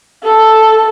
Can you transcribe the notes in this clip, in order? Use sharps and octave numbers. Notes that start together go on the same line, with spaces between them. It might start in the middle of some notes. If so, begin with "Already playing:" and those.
A4